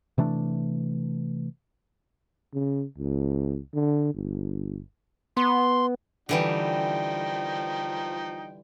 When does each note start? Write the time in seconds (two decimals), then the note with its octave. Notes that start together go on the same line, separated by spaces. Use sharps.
0.18 C3 E3 A3 D4
2.54 C#3
2.98 C#2
3.74 D3
4.14 G1
5.37 B3 C6
6.29 D3 E3 F3 G3 D#4 G5